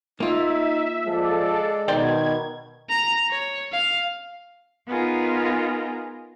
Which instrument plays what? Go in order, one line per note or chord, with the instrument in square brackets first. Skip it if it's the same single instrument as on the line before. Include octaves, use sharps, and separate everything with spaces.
[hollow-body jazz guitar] A#3 F4 [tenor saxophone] D#4 [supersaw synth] E5
[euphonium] F3 [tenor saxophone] G#3 [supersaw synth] A4 D5
[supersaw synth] B2 G#6 [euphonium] D#3 [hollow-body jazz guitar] C5 D5 G5
[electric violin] A#5
C#5
F5
[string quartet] B3 D#4 F4 G#4 A#4